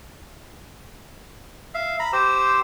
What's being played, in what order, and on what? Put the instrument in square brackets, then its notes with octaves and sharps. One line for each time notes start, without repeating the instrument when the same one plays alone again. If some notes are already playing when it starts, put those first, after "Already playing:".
[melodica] E5 F5
A#5 B5
G4 C5 E6